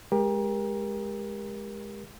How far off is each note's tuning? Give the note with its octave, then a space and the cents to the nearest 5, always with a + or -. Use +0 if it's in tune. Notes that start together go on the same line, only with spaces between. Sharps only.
G#3 +0 G4 +30 A#4 +25